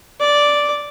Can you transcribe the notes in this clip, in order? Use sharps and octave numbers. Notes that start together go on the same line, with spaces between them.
D5